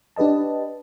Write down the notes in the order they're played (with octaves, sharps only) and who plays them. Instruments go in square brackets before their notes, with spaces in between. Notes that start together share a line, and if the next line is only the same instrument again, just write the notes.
[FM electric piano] D4 G4 B4 D#5 A5